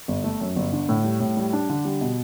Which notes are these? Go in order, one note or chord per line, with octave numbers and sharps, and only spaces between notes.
G1
A3
F#2
G1
D3
A2
G3
A2
G3
D4
D3
G3
B2